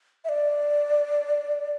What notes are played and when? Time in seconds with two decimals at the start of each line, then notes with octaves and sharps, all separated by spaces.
0.25 E5
0.29 D5